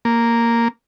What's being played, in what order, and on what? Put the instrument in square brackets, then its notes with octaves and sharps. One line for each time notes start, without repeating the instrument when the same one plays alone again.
[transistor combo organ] A#3